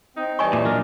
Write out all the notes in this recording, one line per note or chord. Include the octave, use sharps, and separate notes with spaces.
C4 D#4
E3 G3 D#5 G#5 A5 C#6
A#2 D6
F#3 D4 A#4